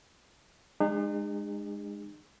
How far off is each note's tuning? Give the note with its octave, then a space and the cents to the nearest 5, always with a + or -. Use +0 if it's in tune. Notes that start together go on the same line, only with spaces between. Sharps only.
G#3 +0 D#4 -45 G#4 -40